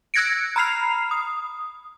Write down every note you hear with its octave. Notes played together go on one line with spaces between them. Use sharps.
E6 F#6 G#6 A#6 C#7 D7
A#5 B5 F6 C7 F7
D#6